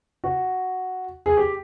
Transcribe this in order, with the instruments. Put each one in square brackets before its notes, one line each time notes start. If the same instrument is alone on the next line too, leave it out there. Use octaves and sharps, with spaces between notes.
[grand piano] F#4
G#4
G4